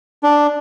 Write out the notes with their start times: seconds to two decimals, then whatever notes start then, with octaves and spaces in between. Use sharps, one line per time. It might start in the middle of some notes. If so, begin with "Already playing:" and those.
0.23 D4